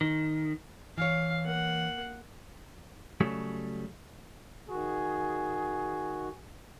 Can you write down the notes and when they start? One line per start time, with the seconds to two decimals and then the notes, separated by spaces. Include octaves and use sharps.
0.01 D#3
0.98 E3 C#5 F5
1.44 A#3 F#5
3.21 C#3 F#3 G3 A3
4.69 D#3 F#4 G#4